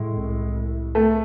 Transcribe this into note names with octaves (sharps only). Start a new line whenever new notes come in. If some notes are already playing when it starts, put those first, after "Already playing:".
Already playing: A2 G#3 E4
C2
C2
A3 A4